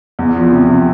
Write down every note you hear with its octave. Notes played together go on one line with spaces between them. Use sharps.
E2
F3
C3
C3